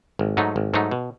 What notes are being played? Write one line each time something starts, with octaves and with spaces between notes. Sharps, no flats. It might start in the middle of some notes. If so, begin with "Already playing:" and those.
G#1
G#2 F#3 A3 D#4
G#1
G#2 F#3 A3 D#4
B2